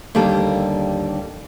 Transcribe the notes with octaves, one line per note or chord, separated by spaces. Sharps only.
D#2 D3 G3 A#3 A4